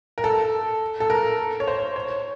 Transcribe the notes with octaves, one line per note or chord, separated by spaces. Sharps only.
A#4
A4
A4
A#4
C#5
C5
C#5